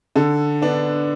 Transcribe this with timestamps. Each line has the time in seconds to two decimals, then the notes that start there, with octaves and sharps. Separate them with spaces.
0.16 D3 A4
0.62 B3 D4